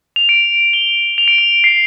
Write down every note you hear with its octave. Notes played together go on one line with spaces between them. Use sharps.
F7
D7
G7
F7
D7
F7
C7